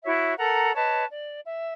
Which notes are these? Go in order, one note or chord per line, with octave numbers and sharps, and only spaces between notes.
E4 F#4 C#5 E5
A4 A#4 F#5 A#5
B4 C#5 D#5 A5
D5
E5